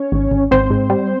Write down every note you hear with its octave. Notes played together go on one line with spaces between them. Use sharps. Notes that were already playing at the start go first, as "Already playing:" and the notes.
Already playing: C#4 C#5
G#1
G#1
G#1 C4 C5
G#2
G3